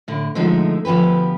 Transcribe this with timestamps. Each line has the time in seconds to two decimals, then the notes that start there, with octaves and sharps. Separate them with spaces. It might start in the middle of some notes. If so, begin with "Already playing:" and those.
0.08 A2 D3
0.35 D3 F3 G#3 A3 D#4
0.85 D2 F3 B3 G4 B4